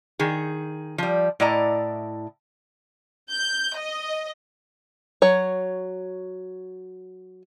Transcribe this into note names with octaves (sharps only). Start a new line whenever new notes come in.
D#3 G#4
F3 G3
A2 E4 D5 D#5 A#5
G6
D#5
F#3 C#5